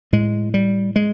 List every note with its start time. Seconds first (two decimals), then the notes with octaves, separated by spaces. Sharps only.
0.13 A2 G#3
0.54 G3
0.96 G#3